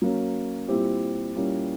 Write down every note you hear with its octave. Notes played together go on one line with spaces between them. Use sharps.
F#3 A#3 C#4
A#2 G3 C4 E4 G4
A#2 G3 A#3 C#4 E4